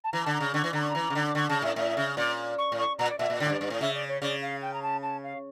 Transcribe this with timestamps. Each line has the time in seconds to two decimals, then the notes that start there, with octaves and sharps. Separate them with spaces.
0.04 A5
0.12 E3 A#5
0.24 D3 A5
0.34 A#5
0.40 C#3
0.53 D3 C#6
0.64 E3
0.73 D3 A#5
0.82 C#6
0.90 A#5
0.95 E3
1.10 C#3
1.15 D3
1.29 D6
1.35 D3 C#6
1.49 C#3 A5
1.62 A2 E5
1.76 A2 E5
1.97 C#3
2.17 A#2 D5
2.58 C#6
2.72 A2
2.78 C#6
2.99 A#2 A#5
3.09 D5
3.19 A#2 E5
3.30 A#2
3.40 D3 D5
3.45 A2
3.50 G2
3.61 G2
3.70 A2
3.81 C#3 E5
3.95 D5
4.08 C#5
4.22 C#3 D5
4.42 F5
4.62 G5
4.74 A#5
4.82 A5
5.03 A5
5.24 F5